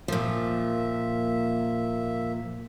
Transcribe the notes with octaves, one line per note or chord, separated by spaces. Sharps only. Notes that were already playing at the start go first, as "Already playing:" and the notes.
A#2 F3 A#3 E5